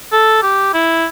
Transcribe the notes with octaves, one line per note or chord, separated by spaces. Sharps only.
A4
G4
E4